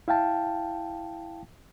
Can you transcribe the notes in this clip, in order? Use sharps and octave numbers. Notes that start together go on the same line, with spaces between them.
E4 F5 G5 A5